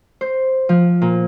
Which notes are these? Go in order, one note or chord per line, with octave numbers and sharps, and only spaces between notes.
C5
F3
A#2